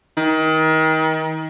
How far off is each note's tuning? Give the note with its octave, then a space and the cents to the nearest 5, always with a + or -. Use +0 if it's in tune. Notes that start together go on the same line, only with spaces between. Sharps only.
D#3 +30